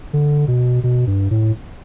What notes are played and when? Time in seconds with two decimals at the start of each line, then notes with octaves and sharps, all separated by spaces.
0.13 D3
0.48 B2
0.84 B2
1.07 G2
1.31 A2